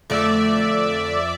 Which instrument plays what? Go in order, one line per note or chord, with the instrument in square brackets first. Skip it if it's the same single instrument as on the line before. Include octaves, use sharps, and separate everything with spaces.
[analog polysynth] F2 D5 E5 [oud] D3 A3